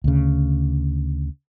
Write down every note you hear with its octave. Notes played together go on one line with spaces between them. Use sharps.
D2 C#3